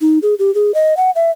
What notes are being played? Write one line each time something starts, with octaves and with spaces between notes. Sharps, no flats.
D#4
G#4
G4
G#4
D#5
F#5
E5